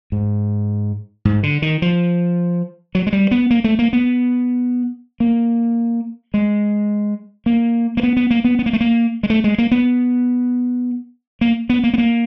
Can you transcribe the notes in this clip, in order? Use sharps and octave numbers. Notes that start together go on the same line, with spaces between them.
G#2
G#2
D3
D#3
F3
F#3
G#3
G3
B3
A#3
A3
A#3
B3
A#3
G#3
A#3
A#3
B3
B3
A#3
B3
B3
A#3
A3
A#3
G#3
A3
G#3
A#3
B3
A#3
B3
A#3
B3
A#3